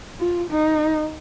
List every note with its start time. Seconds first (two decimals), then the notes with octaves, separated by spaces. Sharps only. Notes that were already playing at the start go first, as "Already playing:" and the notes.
0.20 F4
0.50 D#4